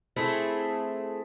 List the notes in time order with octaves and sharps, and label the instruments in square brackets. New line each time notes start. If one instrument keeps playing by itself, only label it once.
[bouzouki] A3 C4 E4 G#4